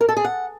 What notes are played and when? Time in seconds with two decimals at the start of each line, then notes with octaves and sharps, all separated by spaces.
0.01 A#4
0.09 A4
0.17 G#4
0.24 F#5